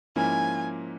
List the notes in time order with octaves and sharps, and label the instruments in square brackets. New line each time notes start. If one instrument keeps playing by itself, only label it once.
[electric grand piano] G#2 F3 A#3 C#4 E4 [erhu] G#5